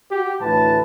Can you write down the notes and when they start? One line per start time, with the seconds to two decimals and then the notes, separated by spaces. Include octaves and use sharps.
0.12 F#4 G4
0.41 D2 A2 E3 B4 A5